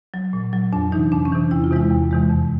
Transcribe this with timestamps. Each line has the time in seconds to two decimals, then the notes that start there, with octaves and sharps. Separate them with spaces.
0.14 F#3
0.33 A#2
0.53 F#3
0.73 F2 D4
0.92 C3 E3 D#4
1.12 F2 D4
1.25 C#4
1.32 C3 E3
1.51 E2 E4
1.64 F4
1.71 C3 E3 G#3 E4
1.91 E2
2.11 C3 E3 G#3
2.30 F2